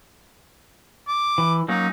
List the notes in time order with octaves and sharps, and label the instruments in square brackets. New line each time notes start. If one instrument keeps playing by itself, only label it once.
[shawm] D6
[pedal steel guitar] E3
[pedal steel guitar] F#3 A#3 C#4 [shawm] D#4